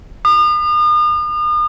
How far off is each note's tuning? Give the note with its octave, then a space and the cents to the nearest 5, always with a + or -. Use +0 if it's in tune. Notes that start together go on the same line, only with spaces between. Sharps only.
D#6 -40